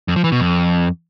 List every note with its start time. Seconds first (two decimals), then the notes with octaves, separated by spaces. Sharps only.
0.08 F2
0.16 F3
0.24 E3
0.32 B2
0.40 F2